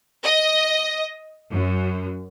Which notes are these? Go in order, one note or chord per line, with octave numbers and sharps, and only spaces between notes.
D#5
F#2